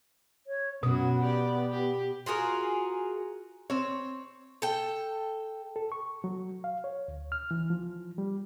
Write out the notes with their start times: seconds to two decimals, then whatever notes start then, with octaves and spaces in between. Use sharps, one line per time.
0.47 C#5
0.83 F#2 B2 B3 F#4 D#6
1.22 G4 D5
1.71 G4
2.26 F4 F#4 G#4 A#4
3.70 C4 C#5
4.62 A4 G5
5.76 A4
5.92 C#6
6.24 F#3
6.64 F5
6.84 C#5
7.08 D2
7.32 F6
7.51 E3
7.70 F3
8.18 G3